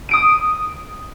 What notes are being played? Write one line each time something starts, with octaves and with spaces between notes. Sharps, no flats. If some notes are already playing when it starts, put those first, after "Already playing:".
D#6 D7 D#7